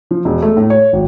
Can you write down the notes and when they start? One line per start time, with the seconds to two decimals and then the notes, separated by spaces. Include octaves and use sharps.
0.11 F3
0.25 E1
0.42 A3
0.57 A2
0.70 C#5
0.93 G#1